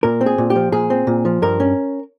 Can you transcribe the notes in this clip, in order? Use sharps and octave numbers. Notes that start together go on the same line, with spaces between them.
A#2 A#4
C4
G#4
A#2
G4
F3
A#2 G#4
C4
A#2
F3
G2 A#4
C#4